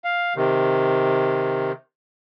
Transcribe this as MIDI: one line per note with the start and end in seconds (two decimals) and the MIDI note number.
0.04 0.33 77
0.36 1.72 48
0.36 1.72 51